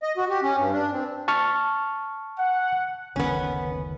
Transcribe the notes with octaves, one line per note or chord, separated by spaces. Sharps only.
D#5
F#4
G4
C#4
G2
D4
C4
A5 C#6 F6
F#5
F#1 D2 D#3 B3 C#4